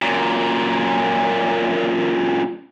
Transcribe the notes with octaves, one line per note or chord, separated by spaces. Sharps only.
F#2 A#2